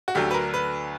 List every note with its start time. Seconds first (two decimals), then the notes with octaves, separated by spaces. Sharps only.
0.08 F#4
0.15 D2 D3 F#3 G4
0.31 B4
0.34 A#4
0.54 B4